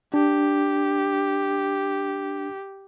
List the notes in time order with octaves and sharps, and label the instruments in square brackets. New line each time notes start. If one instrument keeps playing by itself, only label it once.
[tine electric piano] D4 [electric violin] G4